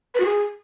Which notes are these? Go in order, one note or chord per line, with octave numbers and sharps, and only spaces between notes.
B4
F#4
G#4